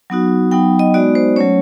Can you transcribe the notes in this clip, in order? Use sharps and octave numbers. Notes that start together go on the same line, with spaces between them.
F#3 B3 D#4 F#4
F#3 B3 D#4 G5
D#5
G#3 B3 D#4 F#4 D5
C5
F#3 A3 C#4 C#5